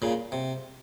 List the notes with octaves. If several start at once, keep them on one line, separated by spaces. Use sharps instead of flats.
A#2 C#3
C3